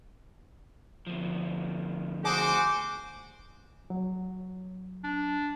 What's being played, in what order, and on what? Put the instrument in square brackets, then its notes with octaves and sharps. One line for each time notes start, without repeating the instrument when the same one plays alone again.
[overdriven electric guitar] D2 F3
[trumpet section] F#4 C5 D6 [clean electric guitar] G#4
[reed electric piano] F#3
[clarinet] D4